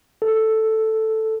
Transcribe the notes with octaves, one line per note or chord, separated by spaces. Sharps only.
A4